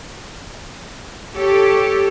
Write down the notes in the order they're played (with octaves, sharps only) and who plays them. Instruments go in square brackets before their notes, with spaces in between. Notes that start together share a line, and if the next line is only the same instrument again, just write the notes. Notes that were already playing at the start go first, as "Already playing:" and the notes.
[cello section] G4 A4 C#5